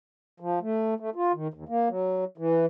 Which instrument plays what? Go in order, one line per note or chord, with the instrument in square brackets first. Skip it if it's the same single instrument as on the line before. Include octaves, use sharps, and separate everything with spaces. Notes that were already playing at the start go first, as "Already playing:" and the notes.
[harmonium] F3
A3
A3
F4
D#3
D#2
A#3
F#3
E3